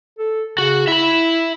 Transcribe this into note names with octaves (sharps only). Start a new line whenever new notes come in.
A4
C#3 F#4
E4 E5 B5